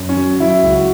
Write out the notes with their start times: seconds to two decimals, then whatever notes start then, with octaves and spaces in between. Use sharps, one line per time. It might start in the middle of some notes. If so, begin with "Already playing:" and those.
Already playing: F#2
0.09 C#4
0.17 F#3
0.40 F#3 E4
0.63 C#2
0.71 F#4